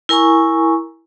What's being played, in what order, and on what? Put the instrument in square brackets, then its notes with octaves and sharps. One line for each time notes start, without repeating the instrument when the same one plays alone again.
[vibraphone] E4 A#4 G#5 A#5 C#6